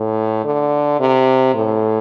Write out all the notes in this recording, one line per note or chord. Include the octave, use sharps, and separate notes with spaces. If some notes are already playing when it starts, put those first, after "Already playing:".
Already playing: A2
D3
C3
A2